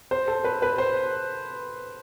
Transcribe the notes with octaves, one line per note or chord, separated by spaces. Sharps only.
C5
A4
B4
B4
C5